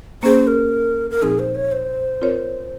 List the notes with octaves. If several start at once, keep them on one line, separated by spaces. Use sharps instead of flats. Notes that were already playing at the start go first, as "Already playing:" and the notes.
A#3 C#4 G#4 C5
A#4
A#4
A#2 F3 C4 D#4 G#4
C5
C#5
C5
C4 F4 A#4 C#5